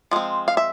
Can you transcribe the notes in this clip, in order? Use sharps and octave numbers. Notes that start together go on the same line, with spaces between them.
F3 G#3 C4
F5
E5